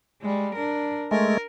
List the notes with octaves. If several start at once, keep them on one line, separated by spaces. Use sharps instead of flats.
G3 G#3
D4 A#4
G#3 A3 A#4